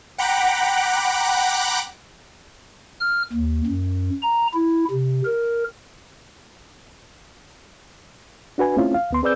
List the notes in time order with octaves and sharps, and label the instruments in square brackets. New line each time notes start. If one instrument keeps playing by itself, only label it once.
[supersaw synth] F#5 G5 A#5 B5 D6 F#6
[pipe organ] F6
D#2
F#2
A#5
E4
C3
A#4
[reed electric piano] D4 F#4 B4 G#5
A3 C4 C#4 E4 F4
F5
D2 B3 C6
C4 G#4 B4 D5 E6 G6